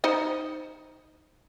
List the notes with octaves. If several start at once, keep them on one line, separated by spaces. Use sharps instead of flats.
D#4 C5 D#5